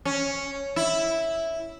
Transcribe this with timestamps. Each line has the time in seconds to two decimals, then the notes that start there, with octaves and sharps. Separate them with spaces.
0.05 C#4
0.76 E4